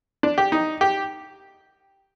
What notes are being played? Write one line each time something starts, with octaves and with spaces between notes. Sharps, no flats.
D4
G4
D#4
G4